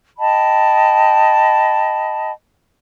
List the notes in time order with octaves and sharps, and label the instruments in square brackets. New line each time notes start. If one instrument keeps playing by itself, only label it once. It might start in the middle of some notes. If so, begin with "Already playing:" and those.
[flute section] D#5 G5 A5 B5